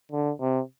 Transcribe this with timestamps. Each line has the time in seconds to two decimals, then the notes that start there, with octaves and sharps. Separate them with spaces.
0.12 D3
0.41 C3